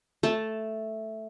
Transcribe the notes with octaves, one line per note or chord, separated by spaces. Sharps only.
A3 A5